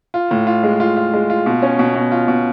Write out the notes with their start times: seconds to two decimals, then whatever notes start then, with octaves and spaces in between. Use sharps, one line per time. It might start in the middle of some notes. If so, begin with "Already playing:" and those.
0.14 F4
0.31 A2
0.47 F4
0.63 G#3
0.80 F4
0.97 F4
1.14 G#3
1.30 F4
1.46 B2
1.62 C#4
1.79 B2
1.95 B2
2.12 F4
2.28 B2